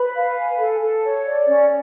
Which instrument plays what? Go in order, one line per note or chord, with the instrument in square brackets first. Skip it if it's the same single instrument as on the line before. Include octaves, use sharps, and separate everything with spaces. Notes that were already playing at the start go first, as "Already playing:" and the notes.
Already playing: [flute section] B4 B5
F5
G#5
A4
A4
C#5
D5
C#4